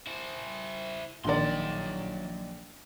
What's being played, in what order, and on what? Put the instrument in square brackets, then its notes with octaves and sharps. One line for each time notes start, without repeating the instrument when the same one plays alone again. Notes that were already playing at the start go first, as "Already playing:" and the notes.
[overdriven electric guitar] E4 C5
[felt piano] A#1 D#3 D5 [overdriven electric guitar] F#3 C6